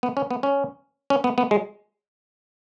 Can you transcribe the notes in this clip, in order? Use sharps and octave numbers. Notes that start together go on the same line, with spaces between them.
B3
C#4
B3
C#4
C#4
B3
B3
G#3